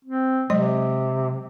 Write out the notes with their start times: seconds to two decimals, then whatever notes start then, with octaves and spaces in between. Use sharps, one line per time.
0.05 C4
0.50 C3 F#3 G#3 D#5